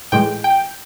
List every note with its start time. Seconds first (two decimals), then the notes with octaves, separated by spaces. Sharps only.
0.12 A2 E3 G#3 G5
0.44 G5